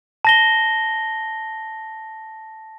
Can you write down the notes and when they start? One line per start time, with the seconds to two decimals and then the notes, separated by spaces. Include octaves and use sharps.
0.25 A5 A#6 G7